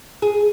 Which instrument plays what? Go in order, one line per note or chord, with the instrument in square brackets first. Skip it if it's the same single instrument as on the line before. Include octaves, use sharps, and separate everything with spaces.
[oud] G#4